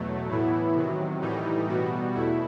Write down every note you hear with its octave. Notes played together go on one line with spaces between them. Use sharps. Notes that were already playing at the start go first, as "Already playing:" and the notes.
Already playing: E2 B2 F#3 A3
A2 E3 B3 E4
C3 D#3 F#3
A2 E3 G3 D#4
B2 G3 B3 F#4
E2 B2 A3 E4